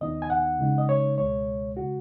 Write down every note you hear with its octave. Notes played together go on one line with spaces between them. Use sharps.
D#2 D#3 B3 D#4 D#5
G#5
F#5
C#3 G#3 D#4
D#5
C#5
C#2 B2 G#3 C#5
C#3 G#3 F#4